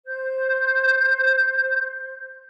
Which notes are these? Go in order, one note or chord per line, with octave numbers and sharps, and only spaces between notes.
C5 G6